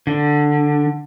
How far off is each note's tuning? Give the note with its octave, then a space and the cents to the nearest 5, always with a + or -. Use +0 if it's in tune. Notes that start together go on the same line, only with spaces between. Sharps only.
D3 +5